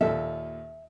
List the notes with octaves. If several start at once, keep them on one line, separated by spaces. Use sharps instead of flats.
D#2 A#2 A4 E5